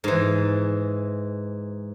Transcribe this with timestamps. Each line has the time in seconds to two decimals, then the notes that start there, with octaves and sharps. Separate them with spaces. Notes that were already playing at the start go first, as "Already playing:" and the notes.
0.04 G#2 E3